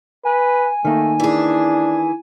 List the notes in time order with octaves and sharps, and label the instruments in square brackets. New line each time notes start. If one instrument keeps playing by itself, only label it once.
[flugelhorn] B4 [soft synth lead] G#5
[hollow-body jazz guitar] D#3 A#3 [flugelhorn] A3
[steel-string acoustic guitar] E3 G#4 [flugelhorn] D4